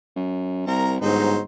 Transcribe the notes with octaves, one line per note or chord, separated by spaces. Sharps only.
F#2
C2 A#4 A#5
G1 G#2 F#3 D#4 C5